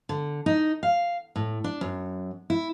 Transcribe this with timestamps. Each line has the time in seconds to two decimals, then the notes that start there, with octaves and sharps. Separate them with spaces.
0.09 D3
0.46 D#4
0.83 F5
1.36 A2
1.64 D4
1.81 F#2
2.50 E4